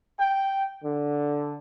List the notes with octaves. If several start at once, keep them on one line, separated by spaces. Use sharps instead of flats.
G5
D3